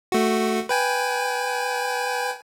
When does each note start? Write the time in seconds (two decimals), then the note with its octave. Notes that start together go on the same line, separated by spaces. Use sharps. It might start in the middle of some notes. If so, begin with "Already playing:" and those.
0.12 A3 F#4
0.69 B4 G5 G#5